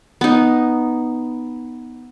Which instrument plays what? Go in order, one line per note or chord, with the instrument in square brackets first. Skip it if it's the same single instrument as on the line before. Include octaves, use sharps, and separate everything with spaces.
[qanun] B3 D#4